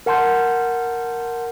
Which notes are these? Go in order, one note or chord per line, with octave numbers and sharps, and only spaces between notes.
A#4 F#5 A5 C6 G6